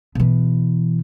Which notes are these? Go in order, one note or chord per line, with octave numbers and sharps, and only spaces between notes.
B2 E3